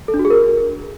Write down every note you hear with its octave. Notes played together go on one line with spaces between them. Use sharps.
A4
D4
F#4
G#4
A#4